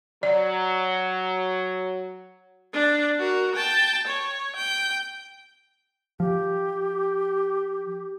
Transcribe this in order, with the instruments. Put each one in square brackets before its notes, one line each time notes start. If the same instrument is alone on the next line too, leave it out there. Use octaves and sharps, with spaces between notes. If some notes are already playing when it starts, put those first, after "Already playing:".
[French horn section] F#3 [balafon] D5
[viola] D4
F#4 A#4
G5 A5
C#5
G5
[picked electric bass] F3 [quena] G4